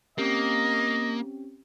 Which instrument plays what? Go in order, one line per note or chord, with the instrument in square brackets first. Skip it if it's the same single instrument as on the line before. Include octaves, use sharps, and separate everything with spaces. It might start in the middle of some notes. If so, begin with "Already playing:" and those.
[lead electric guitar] A#3 [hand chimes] C4 C#4 G4 [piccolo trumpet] D#5